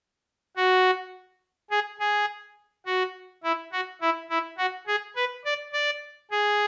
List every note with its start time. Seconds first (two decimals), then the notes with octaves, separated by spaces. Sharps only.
0.57 F#4
1.71 G#4
1.99 G#4
2.86 F#4
3.43 E4
3.72 F#4
4.01 E4
4.30 E4
4.58 F#4
4.87 G#4
5.16 B4
5.45 D5
5.73 D5
6.31 G#4